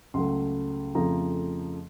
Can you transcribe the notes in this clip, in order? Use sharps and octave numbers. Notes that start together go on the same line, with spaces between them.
C#2 C#3 F#3 A3 C6
F2 C#3 F3 A3 A#5